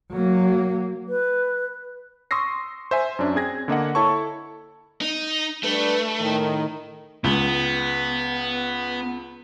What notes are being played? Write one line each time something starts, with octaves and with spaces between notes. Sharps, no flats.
F#3 A#3
B4
C6 C#6 D#6 E6 A#6 C7
C5 E5 G#5
F#2 C#4 D4
C4 G#4 G#6 A#6
D3 A#3 D#5 F#5
E4 A4 C#5 A5 C#6
D#4
G3 A3 D4 B4
A2 D#3
C#2 B3